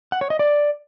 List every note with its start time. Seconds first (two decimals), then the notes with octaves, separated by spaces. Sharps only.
0.12 F#5
0.21 C#5
0.30 D#5
0.39 D5